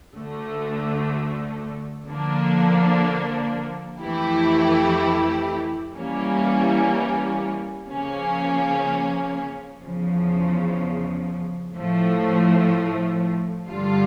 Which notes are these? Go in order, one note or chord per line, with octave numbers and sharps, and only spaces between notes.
D2 D3 A3
D3 F3 A#3 D4
F2 E3 A3 E4 G4
E3 G3 A#3 C#4
C#3 F3 A#3 C#4
E2 C#3 F3
A2 F3 A3
G2 D3 G3 D4 F4